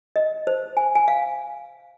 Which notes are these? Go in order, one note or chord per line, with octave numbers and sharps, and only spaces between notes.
D#5
C5
G#5
G#5
F5